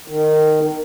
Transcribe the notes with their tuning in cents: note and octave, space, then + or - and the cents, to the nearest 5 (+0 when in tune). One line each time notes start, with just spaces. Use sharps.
D#3 -15